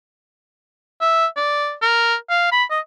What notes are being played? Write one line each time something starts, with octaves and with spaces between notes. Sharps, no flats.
E5
D5
A#4
F5
B5
D#5